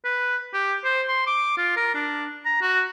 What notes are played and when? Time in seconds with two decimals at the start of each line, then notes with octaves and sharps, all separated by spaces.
0.05 B4
0.54 G4
0.84 C5
1.08 C6
1.27 D6
1.57 F4
1.77 A#4
1.94 D4
2.46 A#5
2.62 F#4